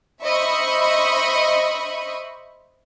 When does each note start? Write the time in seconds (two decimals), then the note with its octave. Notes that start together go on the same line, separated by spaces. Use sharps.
0.22 C5 D#5 E5 B5 C#6